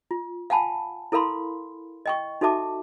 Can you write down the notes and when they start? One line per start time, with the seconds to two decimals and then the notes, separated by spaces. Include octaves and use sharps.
0.11 F4
0.50 F5 F#5 G#5 A5 B5
1.12 E4 A4 A#4 F5 B5 C6
2.06 D#5 G5 C#6
2.41 D#4 F#4 A4 E5 A5 D6